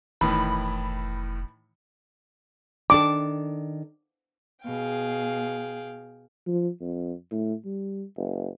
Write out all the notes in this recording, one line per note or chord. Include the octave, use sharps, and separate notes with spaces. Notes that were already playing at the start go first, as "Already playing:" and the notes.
F1 A2 D#3 E3 B5
D#3 D4 A4 D6
B2 G#4 F5 G5
F3
F2
A2
G3
F#1